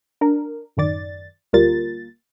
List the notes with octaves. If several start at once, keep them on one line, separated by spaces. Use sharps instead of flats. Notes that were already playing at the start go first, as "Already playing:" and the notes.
D4 A#4
A1 F#2 D#3 D5 A6
D2 G3 A#3 F4 A#4 A6